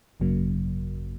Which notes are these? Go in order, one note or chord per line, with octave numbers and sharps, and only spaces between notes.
G#1 F#2 C#3 F#3 A#3